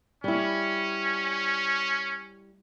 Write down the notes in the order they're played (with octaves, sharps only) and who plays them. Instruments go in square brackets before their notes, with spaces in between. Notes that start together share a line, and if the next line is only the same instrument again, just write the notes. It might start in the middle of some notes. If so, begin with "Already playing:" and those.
[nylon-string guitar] G3 E4 [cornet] C#4